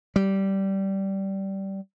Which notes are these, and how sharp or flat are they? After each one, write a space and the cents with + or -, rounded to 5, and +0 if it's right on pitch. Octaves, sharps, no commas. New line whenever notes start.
G3 -15